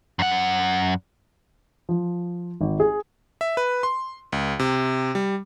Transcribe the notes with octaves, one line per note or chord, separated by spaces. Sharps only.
F#2 F#5
F3
G#1
G#4
E5
B4
C6
C#2
C3
G3